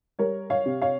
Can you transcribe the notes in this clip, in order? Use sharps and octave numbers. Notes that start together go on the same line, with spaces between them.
G3 A#4 C#5
C#5 F5
C3
C#5 F5